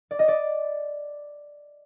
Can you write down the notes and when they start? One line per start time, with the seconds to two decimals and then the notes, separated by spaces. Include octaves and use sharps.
0.11 D5
0.19 D#5
0.28 D5